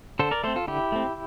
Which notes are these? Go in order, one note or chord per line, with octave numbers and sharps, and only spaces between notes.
D3 A4 C5
A#4 D5
A3 C4 A4 C5
F4 A4
D3 E4 G4
A3 C4